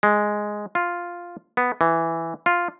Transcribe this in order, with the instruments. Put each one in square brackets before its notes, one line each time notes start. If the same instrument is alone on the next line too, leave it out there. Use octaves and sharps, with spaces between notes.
[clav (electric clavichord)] G#3
F4
B3
E3
F4